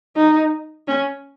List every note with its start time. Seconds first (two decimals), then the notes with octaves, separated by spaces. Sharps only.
0.16 D#4
0.88 C#4